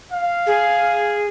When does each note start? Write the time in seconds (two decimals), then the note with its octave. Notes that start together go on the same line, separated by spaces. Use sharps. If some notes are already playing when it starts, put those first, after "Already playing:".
0.12 F5
0.46 G#4